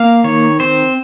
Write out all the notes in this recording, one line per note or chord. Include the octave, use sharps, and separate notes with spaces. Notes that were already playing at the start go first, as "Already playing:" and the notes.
Already playing: A#3 F5
D#3 C#5
C4 C5